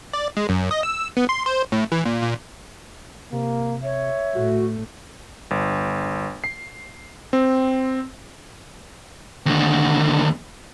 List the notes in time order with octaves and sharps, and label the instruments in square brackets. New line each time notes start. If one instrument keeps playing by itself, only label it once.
[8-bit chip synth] D5
G#3
F#2
D#5
E6
B3
C6
C5
A2
E3
A#2
A#2
[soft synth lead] C3 [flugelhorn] A#3
[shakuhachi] C#5 [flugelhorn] E5
[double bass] A2 A3 [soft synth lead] F#4
[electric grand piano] G1
C7
C4
[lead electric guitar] D#2 D3